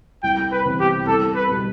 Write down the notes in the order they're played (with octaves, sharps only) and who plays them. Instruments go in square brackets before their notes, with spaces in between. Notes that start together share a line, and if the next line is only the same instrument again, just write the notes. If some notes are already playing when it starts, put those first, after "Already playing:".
[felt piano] C2 [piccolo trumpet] G5
[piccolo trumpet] B4
[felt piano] C3 E3 B3
[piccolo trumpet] G4
[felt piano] C2 [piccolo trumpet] A4
[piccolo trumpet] B4
[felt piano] B2 G3